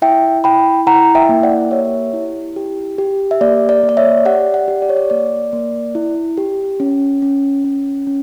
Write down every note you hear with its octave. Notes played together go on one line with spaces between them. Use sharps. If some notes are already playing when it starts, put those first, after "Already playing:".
E4 E5 G5
E4 G5 B5
E4 F#5 A#5
E5 G5
A#3
D5 F#5
G4 C#5 E5
E4
G4
G4
E5
A#3 D5
D5
A#3
D5
C#5 E5
G4 D5 F#5
D5 F#5
G4
D5
C#5
D5
A#3 D5
A#3
E4
G4
C#4
C#4
C#4
C#4